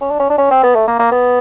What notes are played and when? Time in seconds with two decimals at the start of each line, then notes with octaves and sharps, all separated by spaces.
0.01 C#4
0.10 D4
0.20 C#4
0.30 D4
0.38 C#4
0.51 C4
0.63 B3
0.75 A3
0.88 A#3
0.99 A#3
1.12 B3